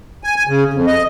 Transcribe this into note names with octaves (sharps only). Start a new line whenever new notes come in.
G#5
G#5
C#3
F2
D#5